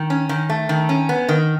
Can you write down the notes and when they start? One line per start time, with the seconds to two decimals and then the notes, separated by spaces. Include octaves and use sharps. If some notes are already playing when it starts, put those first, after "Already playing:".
Already playing: D#3
0.10 C#4
0.29 D#3
0.50 A3
0.69 D#3
0.89 C#4
1.09 B3
1.29 D#3